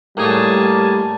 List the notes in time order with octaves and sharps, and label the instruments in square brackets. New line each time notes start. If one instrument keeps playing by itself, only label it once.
[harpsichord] A2 G#4 C#5 [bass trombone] G3 [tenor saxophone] A#3 [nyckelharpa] G#5 A5